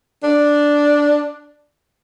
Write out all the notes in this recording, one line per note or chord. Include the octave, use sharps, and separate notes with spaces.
D4